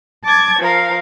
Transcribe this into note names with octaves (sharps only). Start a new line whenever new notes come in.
A5 D6 G#6
F3 A#4 F5